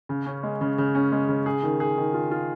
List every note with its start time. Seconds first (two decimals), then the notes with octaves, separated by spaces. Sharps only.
0.09 C#3
0.26 C#4
0.43 G#3
0.61 C#3
0.78 C#3
0.95 C#4
1.12 G#3
1.29 C#3
1.46 G#4
1.63 D#3
1.80 G#4
1.98 D#3
2.14 F4
2.31 F4